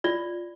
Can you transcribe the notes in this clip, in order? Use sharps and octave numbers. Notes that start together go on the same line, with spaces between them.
F4 D5